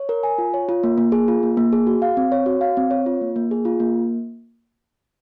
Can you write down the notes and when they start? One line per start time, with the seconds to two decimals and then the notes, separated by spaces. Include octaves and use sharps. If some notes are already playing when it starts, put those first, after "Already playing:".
Already playing: C#5
0.09 A#4
0.23 G#5
0.38 F4
0.54 C#5
0.69 F4
0.83 A#3
0.98 A#3
1.12 G#4
1.28 F4
1.43 A#3
1.57 A#3
1.73 G#4
1.87 F#4
2.02 F5
2.17 C4
2.32 C#5
2.46 F#4
2.61 F5
2.77 C4
2.91 C#5
3.06 F4
3.21 A#3
3.36 A#3
3.51 G#4
3.65 F4
3.80 A#3